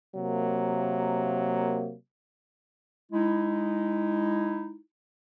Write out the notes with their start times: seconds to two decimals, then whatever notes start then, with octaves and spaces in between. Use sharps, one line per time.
0.16 C3 F#3 A#3
3.11 G#3 D#4 E4